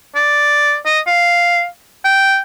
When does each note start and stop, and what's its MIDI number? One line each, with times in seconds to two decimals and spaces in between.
0.16 0.77 74
0.86 1.00 75
1.07 1.66 77
2.05 2.40 79